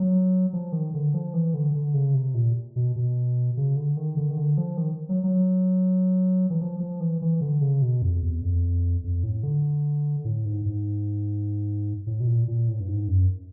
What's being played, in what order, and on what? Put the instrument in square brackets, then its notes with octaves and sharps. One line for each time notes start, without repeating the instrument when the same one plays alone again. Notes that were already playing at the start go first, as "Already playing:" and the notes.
Already playing: [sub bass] F#3
F3
D#3
D3
F3
E3
D3
D3
C#3
C3
A#2
B2
B2
C#3
D3
D#3
D3
D#3
D3
F3
D#3
F#3
F#3
E3
F3
F3
E3
E3
D3
C#3
B2
F2
E2
F2
F2
A2
D3
A2
G#2
G#2
A2
B2
A#2
A#2
A2
G2
G#2
F#2